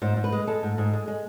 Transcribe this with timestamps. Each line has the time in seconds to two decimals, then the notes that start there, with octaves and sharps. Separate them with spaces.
0.02 G#2 C5
0.17 G#2
0.24 B4
0.32 G#3
0.47 G#3 A4
0.63 G#2
0.78 G#2
0.93 G#3
1.08 G#3